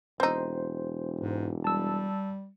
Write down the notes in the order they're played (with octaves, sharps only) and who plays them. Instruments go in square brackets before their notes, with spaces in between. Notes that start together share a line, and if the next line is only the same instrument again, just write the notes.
[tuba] E1 [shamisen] C4 D#4 [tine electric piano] C5
[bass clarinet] G#2
[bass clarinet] G3 [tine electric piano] A5 E6